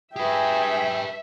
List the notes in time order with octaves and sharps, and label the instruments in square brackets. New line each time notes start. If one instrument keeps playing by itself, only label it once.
[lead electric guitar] G4 B4 [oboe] G#4 [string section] E5 [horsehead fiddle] G5 G#5